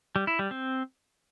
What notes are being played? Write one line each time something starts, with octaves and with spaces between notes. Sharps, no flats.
G3
E4
G3
C4